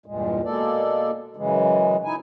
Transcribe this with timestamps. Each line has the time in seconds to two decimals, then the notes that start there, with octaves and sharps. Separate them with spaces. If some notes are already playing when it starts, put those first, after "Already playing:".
0.06 E2 G2 A#2 G#3
0.45 B2 G#3 A#3 A4 D5
1.36 F#2 C#3 E3 G#3
2.05 D#4 E4 G#5